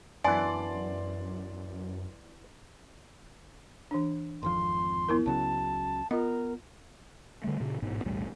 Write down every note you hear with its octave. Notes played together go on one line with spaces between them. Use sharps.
F#2 E3 B3 D4 D5 G#5 C6 A6
E3 D4
G#1 F2 F3 C6
B3 E4 A#4
C#2 C#3 F#3 A5
B3 F4 A#4 D#5
D3 D#3 G3 A3
A#2 C#3
A1 G#2 B2 E3
B1 E2 A2 G3